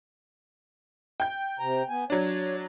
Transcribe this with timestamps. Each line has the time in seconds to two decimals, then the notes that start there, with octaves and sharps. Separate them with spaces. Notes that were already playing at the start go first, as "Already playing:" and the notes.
1.20 G5 G6
1.59 C3 A#5
1.89 B3 G#5
2.10 F#3 D4 C#5